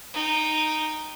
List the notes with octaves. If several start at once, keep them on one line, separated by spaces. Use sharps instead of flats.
D#4 G5